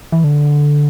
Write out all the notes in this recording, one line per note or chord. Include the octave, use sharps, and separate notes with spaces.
E3
D3